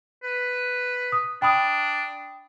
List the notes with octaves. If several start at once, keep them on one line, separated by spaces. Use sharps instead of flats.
B4
D#6
D4 G5 B5 D#6